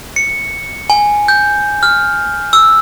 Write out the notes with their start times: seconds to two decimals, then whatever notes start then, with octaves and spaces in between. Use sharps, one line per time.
0.16 C#7
0.90 G#5
1.28 G6
1.83 F6
2.53 E6